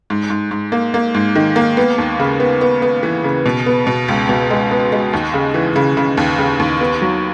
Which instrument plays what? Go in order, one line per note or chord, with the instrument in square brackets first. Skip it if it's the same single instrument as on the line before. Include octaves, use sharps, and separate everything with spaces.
[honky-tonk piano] G#2
G#2
G#2
A#3
A#3
G#2
D#3
A#3
B3
D#2
C#3
B3
B3
B3
E3
C#3
B2
B3
B2
C#2
B2
G#3
B3
G#3
D#2
C#3
E3
C#3
C#3
D#2
C#3
D#2
B3
F#3